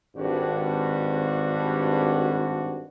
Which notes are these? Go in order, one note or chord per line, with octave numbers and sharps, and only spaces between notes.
G#1 G2 F#4